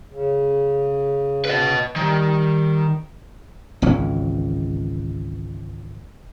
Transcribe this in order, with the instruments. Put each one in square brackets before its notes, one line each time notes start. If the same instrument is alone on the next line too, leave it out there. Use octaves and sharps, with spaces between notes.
[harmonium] C#3
[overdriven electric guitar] B4 D#5
[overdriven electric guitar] D#3 [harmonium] G3
[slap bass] G#1 C#2 E3 C#4